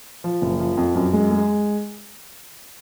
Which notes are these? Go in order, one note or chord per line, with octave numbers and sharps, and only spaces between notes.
F3
F#1
F3
F2
F#2
G#3
G#3